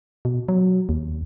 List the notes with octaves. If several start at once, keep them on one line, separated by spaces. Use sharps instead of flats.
B2
F#3
D#2